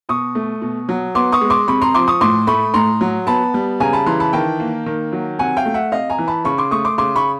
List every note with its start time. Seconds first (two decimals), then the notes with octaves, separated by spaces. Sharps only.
0.09 B2 C#6 D#6
0.35 A3
0.61 B2
0.89 F#3
1.15 B3 C6 D6
1.32 C#6 D#6
1.42 G#3
1.50 C6 D6
1.67 C3 B5 C#6
1.81 A#5 C6
1.94 F3 C6 D6
2.08 C#6 D#6
2.21 A2 C6 D6
2.47 A3 B5 C#6
2.74 A2 A#5 C6
3.01 F#3
3.27 B3 A5 B5
3.54 G3
3.80 C#3 G#5 A#5
3.93 A5 B5
4.06 E3 A#5 C6
4.20 A5 B5
4.33 D#3 G5 A5
4.59 A#3
4.86 D#3
5.12 F#3
5.39 C3 F#5 G#5
5.57 F5 G5
5.65 A3
5.74 E5 F#5
5.92 C3 D#5 F5
6.10 G#5 A#5
6.18 E3
6.28 A5 B5
6.45 C#3 B5 C#6
6.58 C6 D6
6.71 A3 C#6 D#6
6.85 C6 D6
6.98 C#3 C6 D6
7.16 B5 C#6